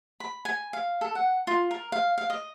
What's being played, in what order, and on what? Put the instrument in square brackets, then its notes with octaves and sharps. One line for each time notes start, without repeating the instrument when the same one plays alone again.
[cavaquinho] B5
G#5
F5
A4
F#5
F4
A#4
F5
F5
D#5